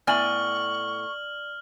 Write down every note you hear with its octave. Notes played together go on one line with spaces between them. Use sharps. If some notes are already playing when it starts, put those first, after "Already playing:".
A2 B3 D5 G#5 C#6 D#6 F6 F#7